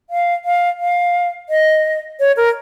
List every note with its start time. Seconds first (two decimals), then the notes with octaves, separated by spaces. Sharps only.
0.10 F5
0.45 F5
0.80 F5
1.49 D#5
2.20 C#5
2.37 A#4